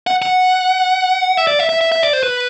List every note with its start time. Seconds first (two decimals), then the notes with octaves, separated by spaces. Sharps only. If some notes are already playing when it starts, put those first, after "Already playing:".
0.07 F#5
0.22 F#5
1.37 E5
1.47 D5
1.59 E5
1.69 E5
1.81 E5
1.92 E5
2.02 D5
2.13 C5
2.23 B4